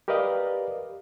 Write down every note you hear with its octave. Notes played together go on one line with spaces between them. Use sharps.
G4 A#4 B4 D5 D#5 F5